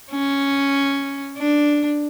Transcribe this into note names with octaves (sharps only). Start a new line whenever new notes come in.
C#4
D4